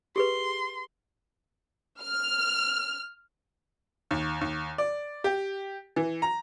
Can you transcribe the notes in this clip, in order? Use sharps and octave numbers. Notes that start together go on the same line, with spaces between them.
G4 G#4 B4 C6
F6
D#2
D#2
D5
G4
E3
A#5